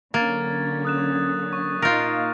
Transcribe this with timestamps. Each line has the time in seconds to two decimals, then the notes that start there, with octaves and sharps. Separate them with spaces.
0.14 D3 F#3 A#3 C#4 G#6 A6
0.85 D#6 F#6 E7
1.53 C#6
1.82 A#2 D#4 F4 A#4 F5 G6 A6